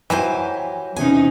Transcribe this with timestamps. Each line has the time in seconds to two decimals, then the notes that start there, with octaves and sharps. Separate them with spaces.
0.10 E3 F#3 G4 C5 G#5
0.96 E2 C3 C#4 D#4 G#5